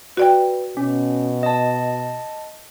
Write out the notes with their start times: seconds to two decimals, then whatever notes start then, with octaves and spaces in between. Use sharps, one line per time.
0.17 F#4 B4 D5 G5
0.77 B2 C#4
1.43 D#5 A5